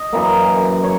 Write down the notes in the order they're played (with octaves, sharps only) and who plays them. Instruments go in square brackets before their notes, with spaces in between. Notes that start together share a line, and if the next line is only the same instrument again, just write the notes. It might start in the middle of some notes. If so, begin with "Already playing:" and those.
Already playing: [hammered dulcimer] D#5
F#2 E3 A#3
C#5